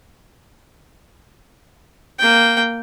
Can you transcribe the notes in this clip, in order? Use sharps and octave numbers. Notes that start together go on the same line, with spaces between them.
A#3 G5